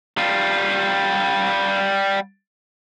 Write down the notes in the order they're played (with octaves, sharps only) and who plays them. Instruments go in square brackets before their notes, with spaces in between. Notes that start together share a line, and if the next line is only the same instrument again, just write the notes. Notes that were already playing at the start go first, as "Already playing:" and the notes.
[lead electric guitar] G3 F4